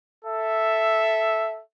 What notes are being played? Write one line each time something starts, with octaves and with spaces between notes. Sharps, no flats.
A4 E5